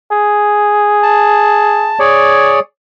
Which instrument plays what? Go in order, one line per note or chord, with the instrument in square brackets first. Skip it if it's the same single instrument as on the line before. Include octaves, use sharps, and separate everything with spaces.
[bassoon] G#4
[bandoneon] A5
G#4 C#5 D5